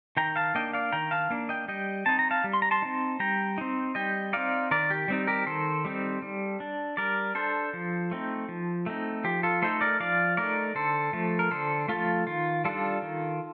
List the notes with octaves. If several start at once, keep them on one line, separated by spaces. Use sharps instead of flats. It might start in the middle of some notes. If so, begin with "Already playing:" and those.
D#3 G5 A#5
F5 A5
A#3 D4 D#5 G5
D5 F5
D#3 G5 A#5
F5 A5
A#3 D4
D#5 G5
G3 D#5 G5
C4 D#4 A5
A#5
F5 A5
G3
C6
A#5
A5 C6
C4 D#4
G3 G5 A#5
C4 D#4
G3 D#5 G5
C4 D#4 D5 F5
D#3 A#4 D5
G4
G3 C4 D#4
G4 A#4
D#3 A4 C5
G3 C4 D#4
G3
D4
G3 A#4 D5
D4 A4 C5
F3
A3 C4 D#4
F3
A3 C4 D#4
F3 G4
F4 A4
A3 D#4 A4 C5
A#4 D5
F3 D5 F5
A3 D#4 A#4 D5
D3 A4 C5
F3 A3
A#4
D3 A4 C5
F3 A3 F4 A4
D#3 F4
G3 D4 F4 A4
D#3